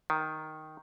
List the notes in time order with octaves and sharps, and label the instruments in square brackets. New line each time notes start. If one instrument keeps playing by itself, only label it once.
[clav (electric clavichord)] D#3